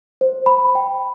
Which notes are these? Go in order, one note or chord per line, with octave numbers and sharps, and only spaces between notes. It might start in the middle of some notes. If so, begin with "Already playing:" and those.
C5
B5
G5